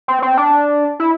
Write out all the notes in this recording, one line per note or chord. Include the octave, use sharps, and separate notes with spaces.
C4
C4
D4
E4